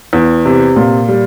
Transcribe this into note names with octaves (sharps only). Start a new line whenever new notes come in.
E2
C3
A#2
G3